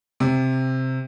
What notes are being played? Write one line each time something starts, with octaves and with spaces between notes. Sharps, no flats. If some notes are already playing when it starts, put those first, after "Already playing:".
C3